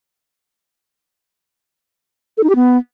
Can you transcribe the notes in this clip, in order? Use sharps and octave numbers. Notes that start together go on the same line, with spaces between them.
A4
D#4
G4
B3